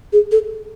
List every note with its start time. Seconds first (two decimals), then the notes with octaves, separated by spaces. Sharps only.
0.13 G#4
0.31 A4